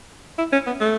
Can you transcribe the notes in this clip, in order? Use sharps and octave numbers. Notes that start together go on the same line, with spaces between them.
E4
C#4
B3
A3